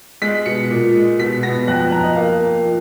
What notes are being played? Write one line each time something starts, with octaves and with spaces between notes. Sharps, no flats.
G#3 B6
B2 C#7
A#2
G#3
B2 B6
B3 A#6
F2 F#6
F#6
F2 A#5
D#5
A#3 F5
A#3
F3